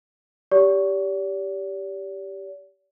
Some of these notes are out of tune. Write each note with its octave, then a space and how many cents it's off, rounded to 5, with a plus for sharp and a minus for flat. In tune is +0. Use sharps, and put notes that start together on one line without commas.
G4 +0 D5 -40